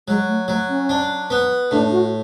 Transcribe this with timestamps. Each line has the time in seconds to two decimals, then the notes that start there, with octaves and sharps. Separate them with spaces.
0.07 F#3 G#3
0.28 A3
0.48 F#3 A3
0.69 C#4
0.89 D4
1.30 B3
1.71 A2 D4
1.92 F#4